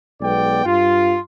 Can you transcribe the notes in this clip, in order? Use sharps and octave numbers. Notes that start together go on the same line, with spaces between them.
B1 G#3 B3 D5 G5
G2 F4